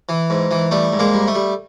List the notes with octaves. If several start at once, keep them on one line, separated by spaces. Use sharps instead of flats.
E3
G#2
E3
G3 A3
G#2
G#3 A#3
G3
A3
G3